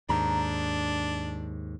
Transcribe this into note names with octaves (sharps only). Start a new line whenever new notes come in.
D#2 G#2 D4 A#5